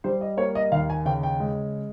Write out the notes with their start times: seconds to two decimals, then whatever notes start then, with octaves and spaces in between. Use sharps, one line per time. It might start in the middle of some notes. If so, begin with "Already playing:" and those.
0.04 G3 C5
0.21 D#5
0.37 A#3 C#5
0.55 D#5
0.72 D#2 F5
0.90 G#5
1.06 C#3 G5
1.23 G5
1.40 G#3